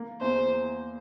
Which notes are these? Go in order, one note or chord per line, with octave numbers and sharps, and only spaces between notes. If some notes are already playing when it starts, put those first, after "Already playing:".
Already playing: A#3
E2 C5